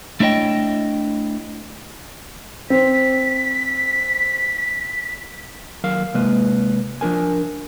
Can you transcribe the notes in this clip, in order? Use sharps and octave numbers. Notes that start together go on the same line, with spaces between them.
A3 D4 E4 C#5 D#5 G5
C4 B6
D#2 F#3 A#4 F5
C3 G#3 A#3 B4
F3 D4 A#4 G#5